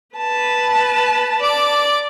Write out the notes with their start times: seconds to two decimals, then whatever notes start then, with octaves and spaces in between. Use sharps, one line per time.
0.16 B4 A5
1.40 D5 D6